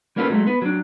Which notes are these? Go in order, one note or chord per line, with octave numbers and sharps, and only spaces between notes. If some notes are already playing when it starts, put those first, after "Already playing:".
G3 A#3 C#4 F4 A4 B4
F#3 G#3 A3
B3 B4
F#3 D4